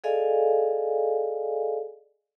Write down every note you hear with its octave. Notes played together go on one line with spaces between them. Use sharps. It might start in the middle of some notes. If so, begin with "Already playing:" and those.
G#4 A4 D5 D#5 F5 G#5